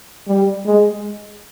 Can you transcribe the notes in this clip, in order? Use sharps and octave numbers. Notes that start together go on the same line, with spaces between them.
G3
G#3